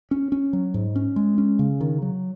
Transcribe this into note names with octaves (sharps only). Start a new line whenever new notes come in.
C#4
C#4
F#3
G#2
C#4
G#3
C#4
C#3
D#3
F#3